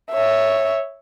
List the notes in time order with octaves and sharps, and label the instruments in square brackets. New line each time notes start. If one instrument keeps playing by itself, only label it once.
[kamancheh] C#5 E5